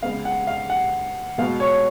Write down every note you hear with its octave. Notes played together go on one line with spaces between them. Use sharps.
C#3 G#3 B3 F5
F#5
F5
F#5
B2 G#3 B3 F5
C#5